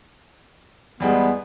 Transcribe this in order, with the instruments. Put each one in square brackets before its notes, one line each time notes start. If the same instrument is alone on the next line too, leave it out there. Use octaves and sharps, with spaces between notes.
[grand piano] E2 G3 G#3 [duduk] B3